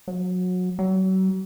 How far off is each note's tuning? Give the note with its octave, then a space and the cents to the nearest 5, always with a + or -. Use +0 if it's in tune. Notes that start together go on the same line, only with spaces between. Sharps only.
F#3 -25
F#3 +35